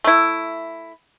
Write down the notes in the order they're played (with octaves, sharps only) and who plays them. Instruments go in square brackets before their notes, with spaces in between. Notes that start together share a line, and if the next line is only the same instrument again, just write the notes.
[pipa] A3 E4